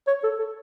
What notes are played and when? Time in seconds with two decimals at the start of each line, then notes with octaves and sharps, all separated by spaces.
0.07 C#5
0.23 A4
0.39 A4